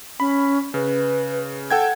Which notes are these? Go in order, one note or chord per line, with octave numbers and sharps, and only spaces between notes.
C#4 B5
C#3 B4
A4 F#5 G5 G#6